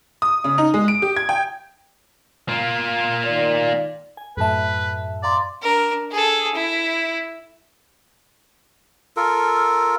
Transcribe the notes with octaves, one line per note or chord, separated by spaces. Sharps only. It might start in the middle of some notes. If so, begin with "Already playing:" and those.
D#6
C#3
D#4
G#3
D7
G4
G#6
G5
A#3 F4
D#3 D5
G#5
F#2 A2 A4 B4 E5 A5
D5 F5 A#5 C6
D4 A#4
G#4 A4
E4
F4 A4 A#4